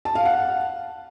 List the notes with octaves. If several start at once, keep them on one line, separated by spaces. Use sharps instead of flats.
A5
F5
F#5